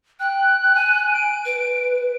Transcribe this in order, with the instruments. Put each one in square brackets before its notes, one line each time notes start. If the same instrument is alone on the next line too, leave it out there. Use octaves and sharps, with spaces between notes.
[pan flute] G5 [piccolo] F#6
[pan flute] G#5
[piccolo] D7
[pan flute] B4